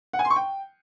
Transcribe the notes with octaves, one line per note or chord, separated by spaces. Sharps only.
F#5
G#5
C6
C#6
G5